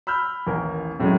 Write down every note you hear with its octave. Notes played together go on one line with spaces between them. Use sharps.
B5 E6 F6 G6
A1 D#2 E4 A#4 G#5
F#2 A2 F#3 G#3 C#4